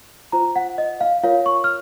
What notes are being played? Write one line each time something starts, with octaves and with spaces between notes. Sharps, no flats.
F4 C5 A#5
F#5
D#5
F5
F4 A#4 C#5 F5
C#6
F6